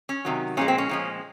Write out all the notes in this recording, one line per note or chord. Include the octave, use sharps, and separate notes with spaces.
C#4
C3 D#3 F#3
A#2 F3 G#3 C#4
C4
C#4
A#2 F3 G#3